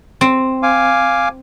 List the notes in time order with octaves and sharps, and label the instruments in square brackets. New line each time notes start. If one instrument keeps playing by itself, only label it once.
[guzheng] C4
[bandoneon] F5 G#5 D6